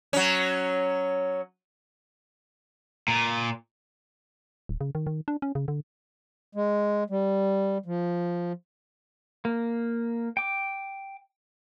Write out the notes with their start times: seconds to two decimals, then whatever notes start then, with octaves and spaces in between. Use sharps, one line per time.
0.13 F#3 C#4
3.08 A#2
4.69 D1
4.81 C#3
4.95 D#3
5.07 D#3
5.28 D4
5.42 C#4
5.55 C#3
5.68 D3
6.55 G#3
7.10 G3
7.86 F3
9.45 A#3
10.37 G5 D6